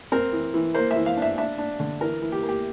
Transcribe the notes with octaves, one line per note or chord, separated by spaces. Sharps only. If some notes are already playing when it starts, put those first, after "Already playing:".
C4 A#4
E3
E3
A#3 C5
E5
E3
F5
D4
E5
D4 E5
D4
D3
E3 A#4
E3
G4
A#3
G4